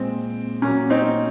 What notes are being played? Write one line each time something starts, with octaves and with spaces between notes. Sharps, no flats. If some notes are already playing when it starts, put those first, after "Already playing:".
Already playing: A#2 G#3 C4
A#2 F#3 A#3 C#4
C4 D#4